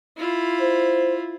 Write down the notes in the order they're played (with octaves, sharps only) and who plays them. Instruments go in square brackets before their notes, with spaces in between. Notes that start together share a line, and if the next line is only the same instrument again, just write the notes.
[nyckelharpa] E4 F4
[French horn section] C5